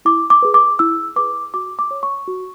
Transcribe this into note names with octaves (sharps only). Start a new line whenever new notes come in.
E4 D6
D6
G#4 B4
D6
E4 E6
G#4 B4 D6
F#4 D6
D6
C#5
C#6
F#4